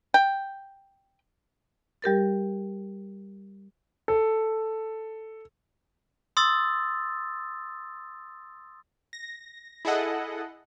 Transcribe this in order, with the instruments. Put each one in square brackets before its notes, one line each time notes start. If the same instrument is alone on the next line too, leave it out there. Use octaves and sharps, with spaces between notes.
[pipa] G5
[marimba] G3 G4 A#4 A6
[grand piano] A4
[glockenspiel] C6 D#6 E6 A6
[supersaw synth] A#6
E4 G#4 A4 D#5 F#5